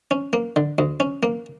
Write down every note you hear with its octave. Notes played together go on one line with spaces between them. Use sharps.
C#4
A#3
D3
D2
C#4
A#3